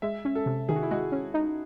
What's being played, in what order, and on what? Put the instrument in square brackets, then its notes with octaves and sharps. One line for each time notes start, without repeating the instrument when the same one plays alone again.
[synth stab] G#3 [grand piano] E5
[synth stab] C#4
[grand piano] A4
[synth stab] C3
[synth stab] D#3 [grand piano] G#4
[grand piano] F#4
E4
[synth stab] G#3 [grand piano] F#4
[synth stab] C#4
D#4